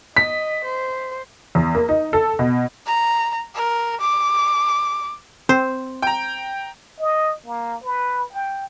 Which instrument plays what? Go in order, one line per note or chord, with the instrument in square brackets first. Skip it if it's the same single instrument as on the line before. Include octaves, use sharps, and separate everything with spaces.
[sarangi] D#5 [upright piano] B6
[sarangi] C5
[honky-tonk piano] E2
A#3
D#4
A4
B2
[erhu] A#5
A#4
D6
[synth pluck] C4 [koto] C5
[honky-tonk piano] G5 A#5
[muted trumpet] D#5
A#3
B4
G5